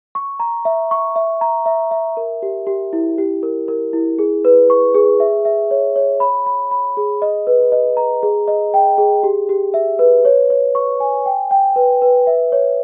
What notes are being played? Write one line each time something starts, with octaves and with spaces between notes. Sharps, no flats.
C#6
A#5
E5
C#6
E5
A#5
E5
E5
A#4
G4
G4
E4
G4
A#4
A#4
E4
G#4
B4
C#6
G#4
E5
E5
C#5
C#5
B5
B5
B5
G#4
D#5
B4
D#5
A#5
G#4
D#5
G5
G#4
G4
G4
E5
B4
C#5
C#5
C#6
G#5
G5
G5
B4
B4
E5
C#5